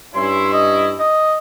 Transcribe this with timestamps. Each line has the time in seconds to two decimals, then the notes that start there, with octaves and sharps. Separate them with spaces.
0.15 G2 C#4 E4 C6
0.53 D#5
0.99 D#5